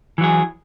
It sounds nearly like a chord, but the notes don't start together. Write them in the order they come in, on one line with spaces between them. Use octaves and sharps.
E3 F#3 G#4